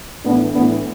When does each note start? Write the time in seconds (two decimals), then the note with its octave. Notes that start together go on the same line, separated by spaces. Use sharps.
0.25 A2 E3 B3 D4
0.53 A2 E3 B3 D4